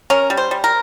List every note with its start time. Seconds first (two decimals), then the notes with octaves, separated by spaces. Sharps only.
0.10 C#4 A#4
0.30 G3
0.37 C5
0.51 G3
0.64 A#4